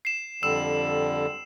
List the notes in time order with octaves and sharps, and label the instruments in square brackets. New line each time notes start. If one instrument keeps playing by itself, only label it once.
[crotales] C7 E7
[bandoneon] F2 D3 G3 [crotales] E6 E7